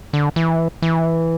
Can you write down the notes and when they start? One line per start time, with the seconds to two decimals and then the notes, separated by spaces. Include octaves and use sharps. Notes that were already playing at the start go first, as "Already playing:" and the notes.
0.13 D3
0.36 E3
0.82 E3